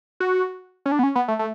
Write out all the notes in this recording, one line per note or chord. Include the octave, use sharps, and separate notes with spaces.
F#4
C#4
D4
B3
C#4
B3
A3
A3